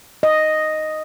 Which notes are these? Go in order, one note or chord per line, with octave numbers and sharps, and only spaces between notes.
D#5